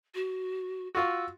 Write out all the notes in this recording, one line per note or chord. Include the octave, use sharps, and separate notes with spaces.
F#4
F4 F#4 E6